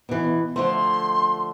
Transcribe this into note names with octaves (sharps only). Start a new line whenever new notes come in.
B2 E3
D3 F3 A3 C6